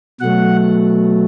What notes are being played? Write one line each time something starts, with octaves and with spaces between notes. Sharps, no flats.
B2 F#3 A3 F#5